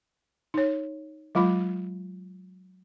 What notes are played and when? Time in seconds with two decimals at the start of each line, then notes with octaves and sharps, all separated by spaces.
0.54 D#4 C#5
1.35 F#3 G#3 F4 B5